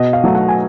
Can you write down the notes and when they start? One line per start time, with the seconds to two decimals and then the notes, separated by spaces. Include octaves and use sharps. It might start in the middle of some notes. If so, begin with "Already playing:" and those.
Already playing: B2 D#5
0.13 F5
0.24 F#3 A3
0.35 F#5
0.49 G#5